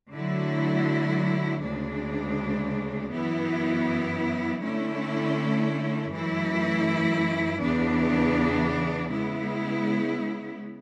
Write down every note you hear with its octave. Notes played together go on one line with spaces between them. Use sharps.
D3 F#3 A3 E4
D2 C#3 G#3 D4
F#2 E3 B3 E4
D3 A3 C#4 E4
F#2 E3 A3 E4
E2 C#3 E3 B3 D4
C#3 G#3 B3 E4